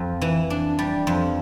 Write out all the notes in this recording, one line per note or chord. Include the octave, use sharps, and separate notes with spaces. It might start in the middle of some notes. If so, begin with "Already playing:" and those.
Already playing: F2
E3
D4
G3
F2